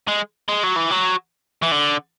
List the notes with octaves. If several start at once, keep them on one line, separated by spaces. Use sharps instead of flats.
G#3
G#3
F#3
E3
F#3
E3
D3